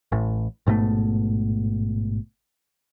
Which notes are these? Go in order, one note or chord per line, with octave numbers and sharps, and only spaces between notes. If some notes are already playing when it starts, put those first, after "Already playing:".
A1 A2
A1 G#2 B2 A3